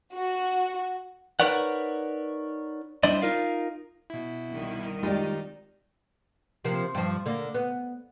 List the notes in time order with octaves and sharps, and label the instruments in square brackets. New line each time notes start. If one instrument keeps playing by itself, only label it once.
[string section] F#4
[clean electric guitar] D#4 A#4 B4 C#5 D5 F#5
G3 D4 E4 C5 D5 D#5
D#4 F4 A#4 F5
[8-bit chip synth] B2 E4
[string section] C2 D#3
[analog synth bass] G#3 [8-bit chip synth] D#4 [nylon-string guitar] F4 G4 D5
[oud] C3 F3 A#3
G2 F3
D3 A#3
B3